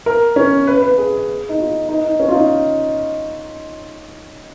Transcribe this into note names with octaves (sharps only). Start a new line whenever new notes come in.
A#4
C#4
B4
B4
G#4
D#4
F4
D#4
D#4
C#4
F4
D#4